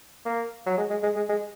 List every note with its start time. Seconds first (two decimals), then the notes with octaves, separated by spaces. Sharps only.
0.25 A#3
0.67 F#3
0.78 G#3
0.90 G#3
1.03 G#3
1.16 G#3
1.29 G#3